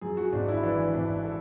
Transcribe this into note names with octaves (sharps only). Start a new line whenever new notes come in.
F#2 G#4
F#4
G#1 D4
E4
E3 D4
G#1 D4
A4